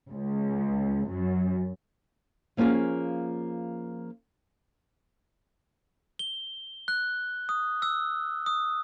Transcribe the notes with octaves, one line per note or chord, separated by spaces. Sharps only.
C#2
F#2
F3 A#3 C#4 F4 G#4
G7
F#6
D#6
E6
D#6